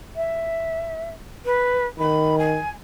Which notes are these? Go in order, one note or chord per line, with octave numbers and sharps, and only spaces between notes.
E5
B4
D#3 B5
G#5